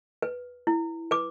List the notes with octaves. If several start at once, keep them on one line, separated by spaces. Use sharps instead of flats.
B4
E4
B4 D6